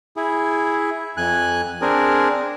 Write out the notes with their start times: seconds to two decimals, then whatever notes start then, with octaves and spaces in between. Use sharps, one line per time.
0.17 E4 G#4
1.17 F2 G#5 F#6
1.82 C4 D4 G#4 A#4